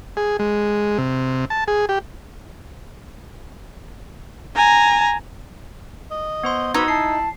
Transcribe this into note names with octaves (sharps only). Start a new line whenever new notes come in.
G#4
G#3
C3
A5
G#4
G4
G#5 A#5
D#5
B3 C5 C6
D#4 F#4 B4 D#6 E6 G#6
E4 A5 C7